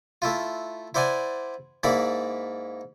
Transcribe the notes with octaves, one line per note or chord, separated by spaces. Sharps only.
A3 E4 F4
E4 C5 D5 F#5 G#5
G#2 A#3 E4 D5 B5